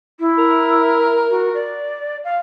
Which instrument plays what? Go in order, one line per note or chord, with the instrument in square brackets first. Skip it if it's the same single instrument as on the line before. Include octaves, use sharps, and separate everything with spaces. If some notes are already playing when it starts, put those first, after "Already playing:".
[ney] E4
[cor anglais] A#4
[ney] F#4
D5
F5